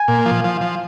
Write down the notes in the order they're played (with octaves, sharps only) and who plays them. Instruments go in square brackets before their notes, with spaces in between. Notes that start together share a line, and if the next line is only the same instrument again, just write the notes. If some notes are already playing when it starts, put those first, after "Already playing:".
Already playing: [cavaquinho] G#5
[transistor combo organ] A#2
F3
F3
F3